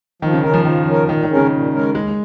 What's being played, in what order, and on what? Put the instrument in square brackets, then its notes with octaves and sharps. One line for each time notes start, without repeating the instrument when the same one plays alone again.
[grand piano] D#3 [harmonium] F3
[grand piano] C#3
[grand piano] D#3 [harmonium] A#4
[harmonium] C#4
[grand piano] F3
[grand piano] D#3 [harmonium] F3
[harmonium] C#4 A#4
[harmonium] A#2 [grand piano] D#3
[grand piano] D#3
[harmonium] G#3 C#4 A#4
[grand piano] C#3
[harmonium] A#2
G#3 C#4 A#4
[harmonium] D#2 [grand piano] G#3